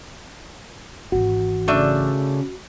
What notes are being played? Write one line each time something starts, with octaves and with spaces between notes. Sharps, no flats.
G#1 E3 F#4
C#3 A3 D4 E5